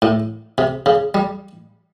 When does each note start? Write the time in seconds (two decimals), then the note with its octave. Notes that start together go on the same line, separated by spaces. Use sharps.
0.02 A2
0.58 C3
0.86 C#3
1.14 G3